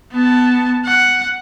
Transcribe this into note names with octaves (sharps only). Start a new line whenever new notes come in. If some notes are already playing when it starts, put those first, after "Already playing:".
B3 A5
F#5